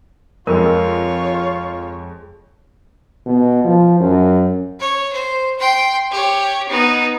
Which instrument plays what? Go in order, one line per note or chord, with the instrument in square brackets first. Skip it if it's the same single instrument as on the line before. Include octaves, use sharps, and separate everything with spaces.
[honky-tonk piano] F2 G#3 [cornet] F4 [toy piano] A#4 [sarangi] C#5
[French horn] B2
F3
F#2
[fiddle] C#5
C5
G5 C6
G4 C#5
B3 D#4